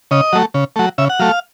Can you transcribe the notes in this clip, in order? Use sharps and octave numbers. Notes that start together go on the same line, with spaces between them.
C#3 D#5
F#3 A3
C#3
F#3 A3
C#3 E5
F#5
F#3 A3 F5